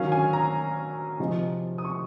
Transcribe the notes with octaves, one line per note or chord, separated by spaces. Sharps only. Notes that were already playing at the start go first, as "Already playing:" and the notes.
Already playing: D#3 F#3 C#4 F5
G#5
A#5
C3 F3 C4 D#4
D#6
C#6